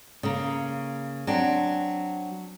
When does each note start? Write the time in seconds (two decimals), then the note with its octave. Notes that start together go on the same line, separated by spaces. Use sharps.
0.23 C#3 A#3
1.27 F#3 C4 D4